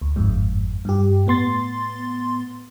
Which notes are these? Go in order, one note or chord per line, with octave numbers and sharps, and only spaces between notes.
D2
G1 F2 G#2
G2 G4
A2 B3 C6 A6